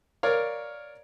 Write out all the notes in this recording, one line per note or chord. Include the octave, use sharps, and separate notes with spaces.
A#4 C#5 D5 F5